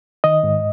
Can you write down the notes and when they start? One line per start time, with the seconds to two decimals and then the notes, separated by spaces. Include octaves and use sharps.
0.24 D#3 D#5
0.44 G#2